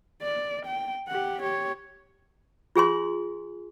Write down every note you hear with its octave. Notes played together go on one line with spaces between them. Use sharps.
D5
G5
G4 F#5
G4 C#5
F4 G#4 G#5 C6